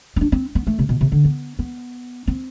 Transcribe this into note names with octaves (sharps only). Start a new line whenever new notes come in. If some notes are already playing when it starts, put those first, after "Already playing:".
C4
D4
C4
B3
A3
C3
B2
C3
D3
B3
B3
C4